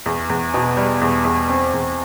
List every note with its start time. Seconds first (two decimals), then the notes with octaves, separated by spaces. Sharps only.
0.06 E2
0.30 E2
0.54 B2
0.77 G3
1.01 E2
1.25 E2
1.49 C4
1.74 E2